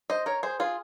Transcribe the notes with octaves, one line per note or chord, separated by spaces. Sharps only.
C5 D#5
A#4 C#5
G#4 C5
F4 G#4